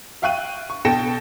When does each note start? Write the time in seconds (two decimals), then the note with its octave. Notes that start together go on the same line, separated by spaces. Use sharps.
0.22 E5 F5 G5 C#6 F#6 D#7
0.70 C#6
0.85 B2 A4 G5 A#6 C#7 E7